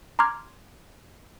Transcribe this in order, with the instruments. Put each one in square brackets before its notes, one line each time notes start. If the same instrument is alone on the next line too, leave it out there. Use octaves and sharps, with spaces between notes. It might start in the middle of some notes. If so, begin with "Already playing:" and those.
[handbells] A#5 C6 D6 F6 G#6